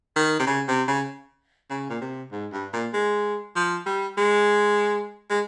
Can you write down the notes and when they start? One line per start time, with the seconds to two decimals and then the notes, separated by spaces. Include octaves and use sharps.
0.16 D#3
0.39 C3
0.47 C#3
0.68 C3
0.88 C#3
1.70 C#3
1.90 A#2
2.01 C3
2.32 G#2
2.53 G2
2.73 A#2
2.93 G#3
3.56 F3
3.86 G3
4.17 G#3
5.30 G#3